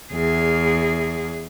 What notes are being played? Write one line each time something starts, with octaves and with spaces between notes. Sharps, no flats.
E2 G#4